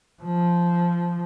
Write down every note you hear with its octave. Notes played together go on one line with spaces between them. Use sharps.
F3